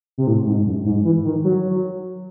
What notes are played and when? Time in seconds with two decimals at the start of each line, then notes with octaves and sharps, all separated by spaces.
0.18 C3
0.27 A2
0.47 G#2
0.66 F#2
0.85 G#2
1.05 E3
1.25 D#3
1.44 F#3